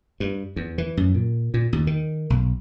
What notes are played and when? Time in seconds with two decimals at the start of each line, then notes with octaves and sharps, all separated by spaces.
0.20 G2
0.56 E2
0.78 E3
0.97 F#2
1.14 A#2
1.54 A#2
1.73 D#2
1.87 D#3
2.30 B1